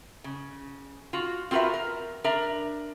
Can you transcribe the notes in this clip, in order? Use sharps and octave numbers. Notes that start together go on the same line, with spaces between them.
C#3
F4 F#4
C4 F4 F#4 A#4 B4 E5
A#4
D4 A#4 E5 A#5